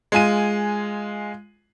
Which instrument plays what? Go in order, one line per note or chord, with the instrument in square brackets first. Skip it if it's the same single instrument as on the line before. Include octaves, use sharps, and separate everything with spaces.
[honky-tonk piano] G#3 F4 G#5 D#7